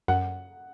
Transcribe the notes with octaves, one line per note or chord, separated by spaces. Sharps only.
F#2 F#5